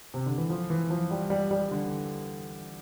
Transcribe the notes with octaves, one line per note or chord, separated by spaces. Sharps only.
C3
D3
E3
F3
E3
F3
G3
G3
G3
D3